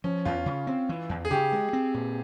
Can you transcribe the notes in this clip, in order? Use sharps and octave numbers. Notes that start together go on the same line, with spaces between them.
F3 C#4
E2 F4
C#3
C4
E3
E2
G#4
C#3 G4
G#3
C4
A#2